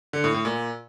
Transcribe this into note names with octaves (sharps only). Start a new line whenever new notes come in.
D3
A2
A2
A#2